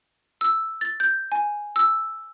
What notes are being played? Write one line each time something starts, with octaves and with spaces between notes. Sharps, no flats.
E6
A6
G6
G#5
E6